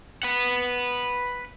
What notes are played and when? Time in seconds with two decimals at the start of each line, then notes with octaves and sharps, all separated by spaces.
0.23 B4 F#5